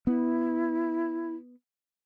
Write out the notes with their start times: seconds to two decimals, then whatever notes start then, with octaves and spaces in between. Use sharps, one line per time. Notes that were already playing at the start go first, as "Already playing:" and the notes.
0.07 B3 E4